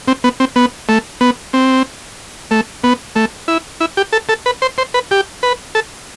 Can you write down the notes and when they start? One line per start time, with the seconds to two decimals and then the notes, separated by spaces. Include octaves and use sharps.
0.08 C4
0.24 B3
0.40 C4
0.56 B3
0.89 A3
1.21 B3
1.53 C4
2.51 A3
2.84 B3
3.16 A3
3.48 E4
3.80 E4
3.97 G4
4.13 A4
4.29 A4
4.46 B4
4.62 C5
4.78 C5
4.94 B4
5.11 G4
5.43 B4
5.75 A4